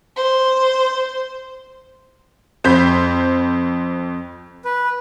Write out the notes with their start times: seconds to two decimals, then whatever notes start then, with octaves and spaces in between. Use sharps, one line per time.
0.16 C5
2.64 F2 C5 B5 G6 B6
4.65 B4